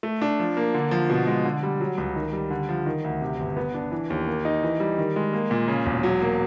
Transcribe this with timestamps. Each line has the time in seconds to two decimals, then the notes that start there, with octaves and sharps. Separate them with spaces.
0.03 A3
0.22 D4
0.40 F3
0.57 A#3
0.74 D3
0.91 F3
1.10 B2
1.27 G#3
1.45 D3
1.63 G3
1.80 F#3
1.98 C#2
2.16 D#3
2.33 G3
2.51 D3
2.69 F3
2.86 D#3
3.04 D2
3.21 C3
3.39 G1
3.57 B3
3.74 D4
3.92 E3
4.10 D#2
4.27 A#3
4.45 D#4
4.63 E3
4.80 G3
4.98 D#3
5.16 G#3
5.33 A#3
5.51 A#2
5.68 C#3
5.86 E1
6.03 F#3
6.22 A#3